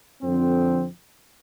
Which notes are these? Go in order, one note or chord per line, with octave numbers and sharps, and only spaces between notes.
F2 D3 F3 C4